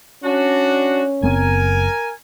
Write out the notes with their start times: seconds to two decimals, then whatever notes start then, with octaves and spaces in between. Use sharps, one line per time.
0.24 C#4 D4 F#4
1.23 F#1 B3 C4 A#4 G#5